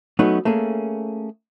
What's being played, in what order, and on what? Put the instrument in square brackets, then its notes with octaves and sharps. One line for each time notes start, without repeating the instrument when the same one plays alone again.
[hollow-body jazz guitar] F#3 A3 B3 C#4 D#4 B4
A3 A#3 C#4 G#4